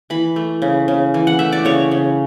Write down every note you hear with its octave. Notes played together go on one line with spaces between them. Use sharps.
E3 B5
A3
C#3
C#3
E3
F#5
A3 E5
D5
C#3 C#5
C#3